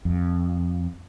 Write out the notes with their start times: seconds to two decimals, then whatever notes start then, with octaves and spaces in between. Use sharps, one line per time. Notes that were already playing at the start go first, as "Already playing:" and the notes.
0.05 F2